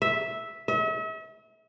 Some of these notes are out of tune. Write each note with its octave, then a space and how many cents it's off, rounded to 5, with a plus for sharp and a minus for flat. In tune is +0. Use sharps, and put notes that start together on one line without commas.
E5 -5
E5 -40